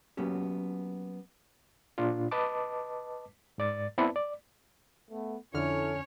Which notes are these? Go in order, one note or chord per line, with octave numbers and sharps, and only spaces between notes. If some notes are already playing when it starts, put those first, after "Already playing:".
F#3 A#3 B3 C#4 G4
A#2 D4 F4
B4 D#5 A5 D6
G#2 D5 A6
B3 C4 E4 B4 D5 A5
D5
A3 B3
F2 D3 C#4 E4 A4 C#5 F6